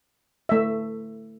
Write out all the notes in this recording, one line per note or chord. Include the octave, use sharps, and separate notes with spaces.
A3 E5